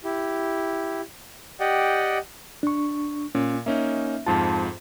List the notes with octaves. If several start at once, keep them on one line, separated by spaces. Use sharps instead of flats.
E4 G4
G4 D5 D#5 F#5 G5
D4 C#6
A#2 C#4
A#3 C#4 D#4 E5
F2 G#2 F4 A5